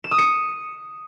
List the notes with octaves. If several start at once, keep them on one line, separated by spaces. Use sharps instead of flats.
E7
D#6
C#7